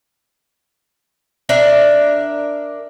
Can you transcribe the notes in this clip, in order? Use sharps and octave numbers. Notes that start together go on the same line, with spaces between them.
D4 A#4 E5